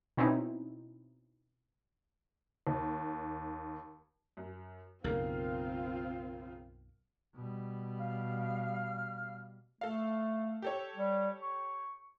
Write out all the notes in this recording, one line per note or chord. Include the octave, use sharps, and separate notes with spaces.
B2 C4 C#4 D#4 E4
D#2
F#2
B1 F#2 C#3 A#3 C4 F4 A#4 F5
B2 G3
F5 F6
A3 A4 F5
G4 A4 C#5
G3
C#6